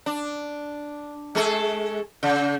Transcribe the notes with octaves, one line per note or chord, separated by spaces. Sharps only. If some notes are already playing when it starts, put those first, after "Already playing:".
D4
G#3 G#4 A4
C#3